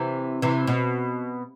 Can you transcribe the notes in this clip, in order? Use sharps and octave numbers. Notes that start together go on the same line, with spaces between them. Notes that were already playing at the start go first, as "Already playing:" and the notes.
Already playing: C3 E3
C3 E3
B2